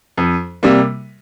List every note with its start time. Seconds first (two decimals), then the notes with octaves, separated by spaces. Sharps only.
0.17 F2
0.63 C3 G3 A#3